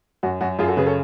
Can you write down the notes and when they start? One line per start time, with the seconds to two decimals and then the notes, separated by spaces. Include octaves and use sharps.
0.23 F#2 F#4
0.41 F#2 F#4
0.59 F#2 F4 G#4
0.68 F#4 A4
0.77 C#3 G#4 B4
0.86 A4 C#5